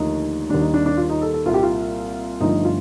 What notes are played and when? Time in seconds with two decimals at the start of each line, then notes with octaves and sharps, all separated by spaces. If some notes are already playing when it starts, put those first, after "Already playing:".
Already playing: D#2 D3 F3 A3 D#4
0.49 D#2 D#3 G3 D4
0.61 D#4
0.74 D4
0.86 D4
0.97 F4
1.10 D#4
1.22 A4
1.34 A4
1.45 C2 A#2 G3 F4
1.54 G4
1.63 F4
2.41 G1 G2 D3 F3 A3 D#4
2.65 F4